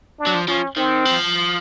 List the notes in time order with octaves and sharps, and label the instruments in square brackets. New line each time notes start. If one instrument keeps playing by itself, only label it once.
[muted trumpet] D4
[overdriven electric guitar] F#3
F3
[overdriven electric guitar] F3 [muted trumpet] C#4
[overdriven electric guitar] D#3 [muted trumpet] C4
[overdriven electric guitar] F3